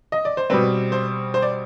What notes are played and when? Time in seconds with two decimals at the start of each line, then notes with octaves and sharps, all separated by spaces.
0.12 D#5
0.25 D5
0.37 C5
0.50 B2 G3 C4 B4
0.92 C5
1.34 C5
1.42 D5